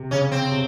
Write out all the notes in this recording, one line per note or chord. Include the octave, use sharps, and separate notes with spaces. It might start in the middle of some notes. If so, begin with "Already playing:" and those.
Already playing: C3
C#3 C#4
C4
C3